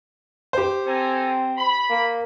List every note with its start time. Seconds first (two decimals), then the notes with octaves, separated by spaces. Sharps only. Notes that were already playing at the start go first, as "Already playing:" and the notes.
0.53 G4 C5
0.87 C4 A4 G#5 A#5
1.58 B5
1.90 A#3